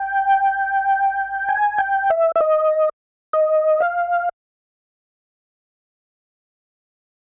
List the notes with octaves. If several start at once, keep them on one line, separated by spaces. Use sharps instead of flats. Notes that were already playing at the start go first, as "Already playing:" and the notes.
Already playing: G5
G#5
G5
E5
E5
D#5
D#5
F5